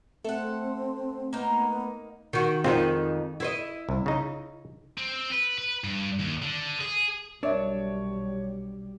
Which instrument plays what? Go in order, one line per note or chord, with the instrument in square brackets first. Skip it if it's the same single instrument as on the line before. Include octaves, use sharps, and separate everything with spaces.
[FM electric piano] A3 [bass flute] C4 [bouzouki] A4 F#5
[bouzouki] A#3 D#4 F5 [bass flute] B3
[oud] D#3 F#4
[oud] F2 D#3 D#4 [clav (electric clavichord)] G#3 C4 F4
[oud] E4 C5 D#5
[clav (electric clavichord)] C2
C#3 D#4
[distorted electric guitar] C4
B4
B4
G2
D#2
D3
G#4
[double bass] B1 G3 [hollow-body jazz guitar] D4 [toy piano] A#4 E5 [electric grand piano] C#5